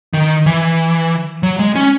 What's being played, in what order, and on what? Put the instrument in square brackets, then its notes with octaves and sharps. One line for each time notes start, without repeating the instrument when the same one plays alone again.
[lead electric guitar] D#3
E3
F#3
G#3
C#4